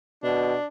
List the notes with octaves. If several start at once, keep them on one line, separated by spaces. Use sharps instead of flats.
B2 D4